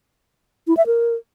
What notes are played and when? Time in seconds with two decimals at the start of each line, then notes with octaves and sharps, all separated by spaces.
0.67 E4
0.77 E5
0.87 A#4